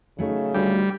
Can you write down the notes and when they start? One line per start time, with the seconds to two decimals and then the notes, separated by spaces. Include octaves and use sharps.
0.18 C#3 F#3 A3 D#4
0.54 D2 G3